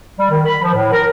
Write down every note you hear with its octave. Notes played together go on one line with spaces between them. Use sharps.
G3
D#3
B5
F3
A2
A#4